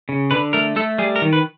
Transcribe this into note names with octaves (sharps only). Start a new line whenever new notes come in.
C#3
D3 B4
A3 A#4
A3 A4
G3 G#4
A#4
D#3
B4